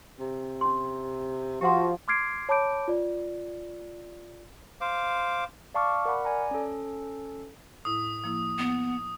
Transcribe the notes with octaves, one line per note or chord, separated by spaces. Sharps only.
C3
C#4 C6
F3 F#4 G4 F#5 C6
C6 D6 F6 G#6 C7 D7
C#5 A5 B5 D6 G6 D7
F4 D5
C5 F5 D6
D5 F5 A5 C#6 D6 F6
A#4 D5 F#5 B5
D5 G#5 A#5
C#4 A4
A2 E4 D#6
F3 A#3 E4
B3